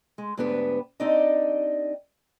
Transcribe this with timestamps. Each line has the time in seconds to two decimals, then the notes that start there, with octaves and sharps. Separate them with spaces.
0.18 G#3
0.37 D2 G#2 B3 D4 G4 B4
1.00 C4 D4 D#4 G4 D5 D#5